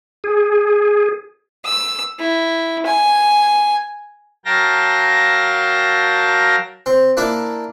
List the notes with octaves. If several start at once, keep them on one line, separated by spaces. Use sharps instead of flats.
G#4
E6
E4
G#5
F#3 A#4 F5 G5 A5 A#6
C4
A#3 D4 E4 D5